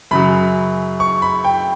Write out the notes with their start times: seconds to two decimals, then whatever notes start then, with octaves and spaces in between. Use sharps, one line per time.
0.11 F#2 C#3 F#3 B5
1.00 C#6
1.22 B5
1.44 G5